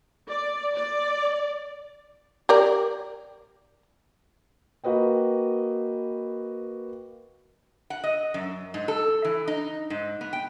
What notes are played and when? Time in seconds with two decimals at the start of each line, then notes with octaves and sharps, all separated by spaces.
0.29 D5
0.75 D5
2.49 G4 A#4 D5
4.84 A#3 F#4 B4 D#5 G5
7.90 F#5
8.04 D#5
8.34 F#2
8.74 G#2
8.88 A4
9.25 E3
9.48 D#4
9.90 G#2
10.21 B3
10.33 G5